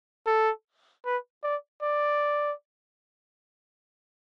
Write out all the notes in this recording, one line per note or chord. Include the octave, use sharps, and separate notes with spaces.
A4
B4
D5
D5